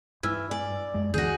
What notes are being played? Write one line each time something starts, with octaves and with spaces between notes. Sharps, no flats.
G2 E3 E6 F6 G#6
D5 G#5
F#2 G#3
D2 D3 E3 F#4 G#4 G6 A#6